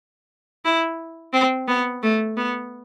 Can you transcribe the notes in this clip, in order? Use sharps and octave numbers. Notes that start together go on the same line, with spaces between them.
E4
C4
B3
A3
B3